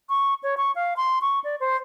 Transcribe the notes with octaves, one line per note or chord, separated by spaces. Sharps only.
C#6
C#5
C#6
F5
C6
C#6
D5
C5